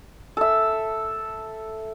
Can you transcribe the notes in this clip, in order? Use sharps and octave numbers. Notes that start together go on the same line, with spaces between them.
A4 E5